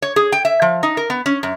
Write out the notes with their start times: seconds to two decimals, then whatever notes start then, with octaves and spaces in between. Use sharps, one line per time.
0.02 C#5
0.16 G#4
0.32 G5
0.45 E5
0.62 F3
0.83 D#4
0.97 A#4
1.10 B3
1.26 C#4
1.43 F#2